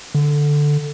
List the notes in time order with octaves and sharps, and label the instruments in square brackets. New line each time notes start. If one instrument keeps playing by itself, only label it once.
[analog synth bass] D3